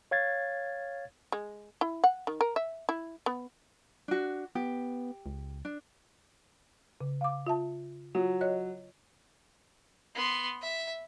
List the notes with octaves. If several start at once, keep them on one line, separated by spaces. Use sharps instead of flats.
C#5 F5 G#6 A6
G#3
E4
F#5
D#3
A#4
E5
E4
B3
D4 F#4
B3 G4
C#2
D4
C#3
F5 D6
F4 E5 A5
F#3 F4
C#5 D#5 F#6
B3 C6
E5